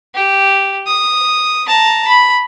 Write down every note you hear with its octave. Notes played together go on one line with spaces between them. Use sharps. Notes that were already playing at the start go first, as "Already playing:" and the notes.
G4
D#6
A5 A#5
B5